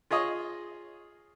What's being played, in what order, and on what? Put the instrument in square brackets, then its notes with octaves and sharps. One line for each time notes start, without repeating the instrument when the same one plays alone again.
[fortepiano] F4 G#4 C#5 D#5